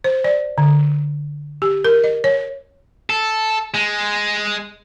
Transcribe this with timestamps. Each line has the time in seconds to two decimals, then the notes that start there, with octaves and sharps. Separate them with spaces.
0.04 C5
0.24 D5
0.58 D3
1.62 G4
1.84 A#4
2.04 D#5
2.24 C#5
3.10 A4
3.74 G#3